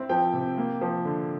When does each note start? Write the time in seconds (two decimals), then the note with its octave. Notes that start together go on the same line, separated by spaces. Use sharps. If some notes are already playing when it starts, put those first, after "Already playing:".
Already playing: C4 E4
0.09 F3 G5
0.33 C3
0.58 A#3
0.81 F3
1.05 D3